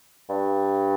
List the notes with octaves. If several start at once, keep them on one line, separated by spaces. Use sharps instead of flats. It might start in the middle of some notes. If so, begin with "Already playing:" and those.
G2